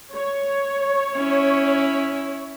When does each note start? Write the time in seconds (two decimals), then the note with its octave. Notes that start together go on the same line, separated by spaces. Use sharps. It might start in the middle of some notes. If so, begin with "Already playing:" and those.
0.14 C#5
1.18 C#4 E4